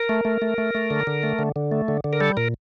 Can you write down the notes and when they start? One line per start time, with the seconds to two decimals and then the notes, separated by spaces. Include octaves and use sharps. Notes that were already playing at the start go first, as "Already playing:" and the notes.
Already playing: A#4
0.09 A3
0.25 A3
0.42 A3
0.58 A3
0.75 A3
0.90 D3
1.07 D3
1.23 A3
1.39 D3
1.56 D3
1.71 A3
1.88 D3
2.04 D3
2.13 A#4
2.20 G3 A4
2.37 A#2 A#4